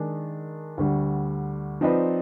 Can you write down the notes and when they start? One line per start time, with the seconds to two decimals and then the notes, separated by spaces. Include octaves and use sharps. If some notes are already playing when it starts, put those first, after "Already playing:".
Already playing: D#3 G#3 D4
0.77 D2 D3 G3
1.81 F3 C4 D#4 B4 D5